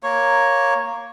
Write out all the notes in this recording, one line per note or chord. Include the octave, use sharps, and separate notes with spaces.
A#3 C#5